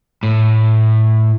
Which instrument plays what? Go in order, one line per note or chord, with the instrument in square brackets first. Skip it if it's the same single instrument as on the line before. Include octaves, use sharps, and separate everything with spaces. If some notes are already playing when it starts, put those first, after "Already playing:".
[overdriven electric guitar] A2